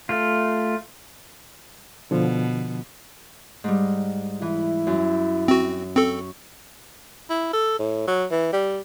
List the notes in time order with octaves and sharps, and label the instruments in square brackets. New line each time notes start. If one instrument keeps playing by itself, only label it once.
[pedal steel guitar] A3 F4
[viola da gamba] B2 [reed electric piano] D3 F3
[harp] G#2 G3
[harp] E3 [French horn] E4
[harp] F#2
[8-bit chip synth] C4 F#4
[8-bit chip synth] C4 A4 [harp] C#6
[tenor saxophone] E4
A4
A2
F#3
E3
G3